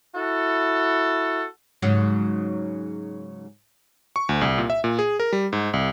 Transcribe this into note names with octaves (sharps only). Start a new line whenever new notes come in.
E4 F#4 A4
G#2 C#3 F#3
C#6
D2
C2
A#2
E5
A#2
G#4
A#4
G3
G#2
C2